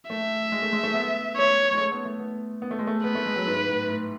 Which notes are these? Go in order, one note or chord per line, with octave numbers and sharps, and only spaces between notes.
A3 E5
G#3
A3
G#3
A3
B3
C#5
G#3
A3
B3
A3
B3
B3
A3
G#3
A3
B3 B4
A3
G#3
F#3
G#2
A2
A2